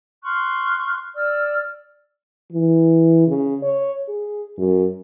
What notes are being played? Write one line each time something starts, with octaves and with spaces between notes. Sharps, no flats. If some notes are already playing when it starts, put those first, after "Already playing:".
C6 C#6 F6 F#6
D5 E6 F6
E3
C#3
C#5
G#4
F#2